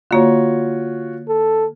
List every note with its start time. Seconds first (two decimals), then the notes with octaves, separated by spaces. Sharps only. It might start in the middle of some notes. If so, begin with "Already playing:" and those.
0.11 D3 A#3 F4 F#4 C#5
1.29 A4